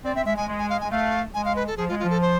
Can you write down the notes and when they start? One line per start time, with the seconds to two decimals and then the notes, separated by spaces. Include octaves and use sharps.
0.05 C4 D5
0.16 C4 E5
0.26 G#3 E5
0.37 G#3 G#5
0.48 G#3
0.59 G#5
0.70 F5
0.81 G#5
0.83 G#3
0.91 A3 F5
1.34 G#3 G#5
1.45 F5
1.56 B4
1.67 A4
1.77 F3 G#4
1.89 G#3 F4
1.99 F4
2.04 F3
2.10 A4
2.21 C5